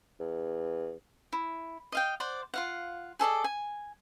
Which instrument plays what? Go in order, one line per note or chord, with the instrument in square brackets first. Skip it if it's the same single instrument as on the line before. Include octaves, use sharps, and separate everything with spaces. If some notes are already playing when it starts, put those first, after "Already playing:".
[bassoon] E2
[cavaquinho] E4
D#5 F5 G5
C5 D5 F#5
F4 F5 F#5
G#4 A4 D5 D#5
G#5